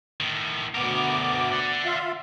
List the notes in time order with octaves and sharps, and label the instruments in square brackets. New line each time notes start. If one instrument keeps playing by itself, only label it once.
[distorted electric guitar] A2 D#3
[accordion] D2 B3 D6 [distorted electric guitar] B2 A#4
[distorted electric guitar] D5 F#5
[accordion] F4 E5 F5